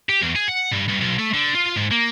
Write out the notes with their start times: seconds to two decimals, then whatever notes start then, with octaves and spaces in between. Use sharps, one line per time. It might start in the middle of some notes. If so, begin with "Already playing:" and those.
0.09 G4
0.22 E2
0.35 G#4
0.48 F#5
0.71 G2
0.88 G2
1.00 B1
1.19 A3
1.33 D3
1.55 F4
1.76 G#2
1.91 A#3